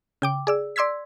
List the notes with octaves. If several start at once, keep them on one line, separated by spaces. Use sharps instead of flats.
C#3 G5 D6
G#4 D5 E6
D5 C6 E6 G#6 B6